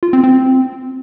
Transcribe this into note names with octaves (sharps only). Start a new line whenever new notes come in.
F4
C4
C4